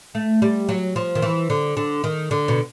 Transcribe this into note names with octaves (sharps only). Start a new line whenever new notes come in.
A3
G3
F#3
F3
D#3
E3
D3
D3
D#3
D3
B2